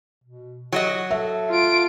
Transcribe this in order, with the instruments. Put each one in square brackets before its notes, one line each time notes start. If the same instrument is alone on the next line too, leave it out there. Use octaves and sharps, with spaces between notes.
[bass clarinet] B2
[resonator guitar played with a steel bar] F#3 F#4 D#5 [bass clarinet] G4
[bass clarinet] A4 [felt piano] E5
[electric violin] F4 D7